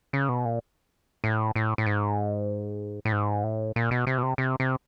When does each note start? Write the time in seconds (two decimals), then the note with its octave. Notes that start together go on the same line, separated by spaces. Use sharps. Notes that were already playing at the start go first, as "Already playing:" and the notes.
0.13 C#3
0.29 B2
0.45 A#2
1.24 A2
1.56 A2
1.78 A2
1.86 G#2
3.05 A2
3.12 G#2
3.44 A2
3.76 A#2
3.91 B2
4.07 C3
4.18 B2
4.23 C3
4.38 C3
4.60 C3